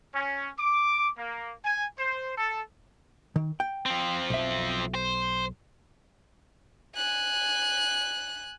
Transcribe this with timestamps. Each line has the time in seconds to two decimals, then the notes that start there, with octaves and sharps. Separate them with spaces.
0.14 C#4
0.59 D6
1.17 A#3
1.64 G#5
1.99 C5
2.37 A4
3.36 D#3
3.60 G5
3.86 F3 C4
4.30 B1 E5
4.95 C5
6.96 G#5 F#6